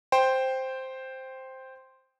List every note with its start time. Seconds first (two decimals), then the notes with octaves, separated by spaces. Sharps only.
0.12 C5 G5